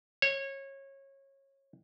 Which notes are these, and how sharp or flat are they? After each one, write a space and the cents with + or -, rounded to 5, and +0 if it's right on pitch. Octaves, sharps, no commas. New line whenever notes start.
C#5 -20